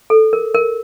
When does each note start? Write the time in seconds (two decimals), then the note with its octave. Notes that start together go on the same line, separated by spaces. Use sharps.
0.10 A4
0.33 A#4
0.54 A#4